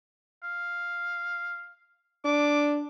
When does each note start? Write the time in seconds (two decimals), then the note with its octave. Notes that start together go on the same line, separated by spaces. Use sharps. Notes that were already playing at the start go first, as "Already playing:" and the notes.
0.43 F5
2.25 D4 D6